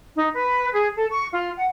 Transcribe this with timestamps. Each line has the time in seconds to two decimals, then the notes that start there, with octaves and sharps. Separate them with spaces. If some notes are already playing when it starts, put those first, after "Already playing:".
0.16 D#4
0.35 B4
0.74 G#4
0.96 A4
1.11 C#6
1.33 F4
1.56 F#5